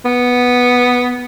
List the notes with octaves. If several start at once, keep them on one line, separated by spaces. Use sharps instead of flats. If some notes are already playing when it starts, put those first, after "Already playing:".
B3